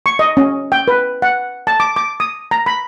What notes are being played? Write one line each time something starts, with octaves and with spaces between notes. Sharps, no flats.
C#6
D#5
C#4
G5
B4
F#5
A5
D6
D6
D#6
A#5
B5